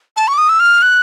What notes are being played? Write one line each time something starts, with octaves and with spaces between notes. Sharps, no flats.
A5
C#6
D6
D#6
E6
F6
F#6